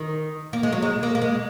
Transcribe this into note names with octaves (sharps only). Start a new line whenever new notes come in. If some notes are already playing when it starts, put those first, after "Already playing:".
Already playing: D#3
A#3
G#3
F#3
G#3
A#3
A#3
G#3